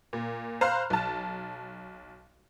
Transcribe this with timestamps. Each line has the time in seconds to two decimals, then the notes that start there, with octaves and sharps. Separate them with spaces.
0.13 A#2
0.61 C5 F5 A#5 B5 F6 F#6
0.90 B1 A5